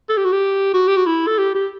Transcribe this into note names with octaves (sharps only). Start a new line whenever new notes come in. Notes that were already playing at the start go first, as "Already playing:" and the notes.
A4
G4
F#4
G4
F#4
G4
F#4
E4
A4
G4
G4